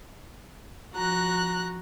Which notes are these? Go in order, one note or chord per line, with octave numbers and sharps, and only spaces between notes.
F3 F#4 A#5 F#6